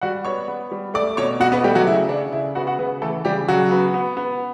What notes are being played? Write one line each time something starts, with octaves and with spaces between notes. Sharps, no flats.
G3 F#4 F#5
B3 C#5 C#6
B3
G3
A3 D5 D6
B2 C#5 C#6
B2 F#4 F#5
B3 B4
G3 A3 G4
F#3 F#4
C#3 E4
C#3 D4
C#3 E4
B3 F#4 F#5
F#4 F#5
C#3 B3 B4
E3 A3 A4
C#3 G3 G4
C#3 F#3 F#4
B3
B3
B3